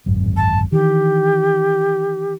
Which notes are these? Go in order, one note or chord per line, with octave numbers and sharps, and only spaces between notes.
D1 G#1 F#2
A5
D#3 E3 G4